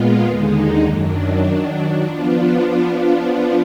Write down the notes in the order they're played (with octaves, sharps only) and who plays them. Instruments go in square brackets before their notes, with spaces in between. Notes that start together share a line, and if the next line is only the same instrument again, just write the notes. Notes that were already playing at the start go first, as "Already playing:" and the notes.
Already playing: [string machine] A#2 G#3 B3 F4
D#2 D3 G#3 D#4
F#2 D#3 F#3 D4
D#3 F#3 D4
F3 B3 D4 F4